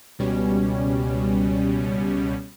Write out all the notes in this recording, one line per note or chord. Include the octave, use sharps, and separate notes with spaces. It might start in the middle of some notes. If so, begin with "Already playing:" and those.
C#2 B2 G3 C#4